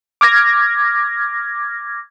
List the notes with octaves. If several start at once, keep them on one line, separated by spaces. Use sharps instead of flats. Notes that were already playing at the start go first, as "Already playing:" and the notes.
D6 F6 G#6 A#6